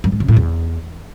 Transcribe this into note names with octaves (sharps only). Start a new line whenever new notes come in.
F#2
G#2
C#3
A2
E2